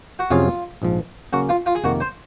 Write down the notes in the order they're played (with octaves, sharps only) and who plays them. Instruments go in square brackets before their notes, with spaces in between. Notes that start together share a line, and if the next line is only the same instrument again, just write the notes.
[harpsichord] F#4
[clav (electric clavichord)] F2 C3 F#3 C#4 G#4 [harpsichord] F4
[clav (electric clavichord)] A#1 G#2 F3
[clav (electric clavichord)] C#3 F#3 A#3 C#4 [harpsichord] F#4
[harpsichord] F4
F4
G#4
[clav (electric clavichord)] F2 C3 D#3 A#3 [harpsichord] F#4
[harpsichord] C5